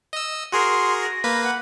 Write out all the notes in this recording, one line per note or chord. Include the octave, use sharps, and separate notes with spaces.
D#5 E6
F#4 G#4 A#4 C6
A#6
A#3 B4 B5
F#5